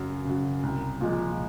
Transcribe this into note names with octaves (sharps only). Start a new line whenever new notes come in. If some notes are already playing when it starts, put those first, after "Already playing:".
Already playing: F#2 C#3 F#3
C#3 F#3
C2
A#2 F3 G#3